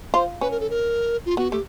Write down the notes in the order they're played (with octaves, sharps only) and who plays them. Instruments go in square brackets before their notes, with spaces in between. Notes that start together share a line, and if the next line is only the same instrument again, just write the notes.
[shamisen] F4 [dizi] C5
[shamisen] C#4 [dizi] B4
[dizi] A#4
A4
A#4
F4
[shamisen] B3 [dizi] F#4
[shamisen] A3 [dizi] G4